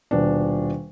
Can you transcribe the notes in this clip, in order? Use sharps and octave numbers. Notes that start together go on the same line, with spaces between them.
D#1 B2 D4